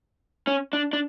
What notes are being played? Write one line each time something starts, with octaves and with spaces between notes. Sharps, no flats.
C#4
D4
D4